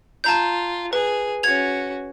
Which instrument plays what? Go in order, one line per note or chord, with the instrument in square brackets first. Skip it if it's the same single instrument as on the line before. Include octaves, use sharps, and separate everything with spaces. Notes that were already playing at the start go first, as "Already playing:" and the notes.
[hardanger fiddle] F4 [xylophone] A5 A#5 G6
[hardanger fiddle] G#4 [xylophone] B4
[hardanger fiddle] C#4 F#4 [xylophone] G#6 F7